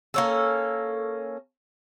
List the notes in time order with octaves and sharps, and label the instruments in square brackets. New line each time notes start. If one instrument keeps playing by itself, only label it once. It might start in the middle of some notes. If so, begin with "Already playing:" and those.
[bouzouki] A#3 C#4 A4